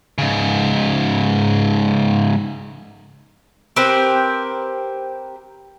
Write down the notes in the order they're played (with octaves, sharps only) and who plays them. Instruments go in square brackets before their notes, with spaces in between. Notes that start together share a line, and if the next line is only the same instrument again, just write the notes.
[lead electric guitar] G#2 C#3
[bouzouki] C4 G4 A#4 B4